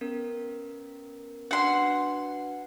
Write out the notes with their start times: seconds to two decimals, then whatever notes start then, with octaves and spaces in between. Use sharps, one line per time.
0.01 B3 C#4 A#4
1.51 D4 F#4 B4 F#5 C6